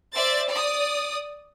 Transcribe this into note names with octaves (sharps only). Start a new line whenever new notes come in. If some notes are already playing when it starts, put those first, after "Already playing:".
C5 D5 E5 A6
D5 D#6